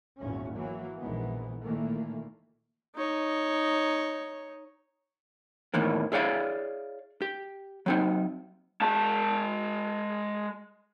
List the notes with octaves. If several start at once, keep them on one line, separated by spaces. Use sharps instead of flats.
G#1 E2 A#2 C#4
E3 F#3 A#3
A#1 D#3 E3 G#3 B3
A#2 D#3 E3 A3 A#3
D#4 C#5
E2 A2 D#3 E3 A#3
E4 G#4 C#5 D5 F5
G4
F#3 C4 D#4
G#3 A5